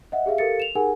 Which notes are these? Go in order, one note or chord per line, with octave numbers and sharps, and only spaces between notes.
D#5 E5 F#5
G4 G#4 E5 F5
G4 A4 A#4 F5 A6 C#7
E7 F7
D#4 G4 G#4 A#4 F#5 G#5